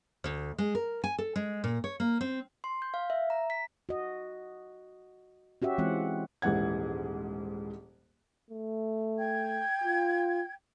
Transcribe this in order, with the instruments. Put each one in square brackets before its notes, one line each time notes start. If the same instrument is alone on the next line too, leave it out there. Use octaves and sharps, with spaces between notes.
[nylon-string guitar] D2
G#3
A#4
G#5
A4
G#3
A#2
C#5
A#3
C4
[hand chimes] C6
G6
F5
E5
A#5
B6
[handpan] F#4 D#5
C#4 F#4 G4 E5
E3 G#3 C4 F4 F#5
[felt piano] D#1 G#2 E3 F#5 G#6
[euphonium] A3
[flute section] G5 G#6
[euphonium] F4